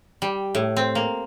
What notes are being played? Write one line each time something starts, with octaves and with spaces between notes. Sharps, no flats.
G3
A2
C4
A#3